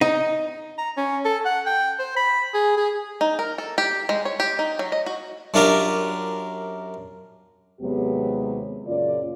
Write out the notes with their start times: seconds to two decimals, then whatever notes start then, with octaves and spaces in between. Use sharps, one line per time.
0.01 D#4
0.78 A#5
0.97 C#4
1.25 A4
1.45 F#5
1.66 G5
1.99 C5
2.17 B5
2.54 G#4
2.77 G#4
3.21 D#4
3.39 A#4
3.58 A4
3.78 G4
4.09 G#3
4.25 C#5
4.40 G4
4.59 D#4
4.79 F#3
4.92 D#5
5.06 F#4
5.54 F#2 D4 F4 G4 A#4
7.81 D#2 C3 F#3 G#3 B3 G4
8.87 F#2 A#2 C#3 F4 D5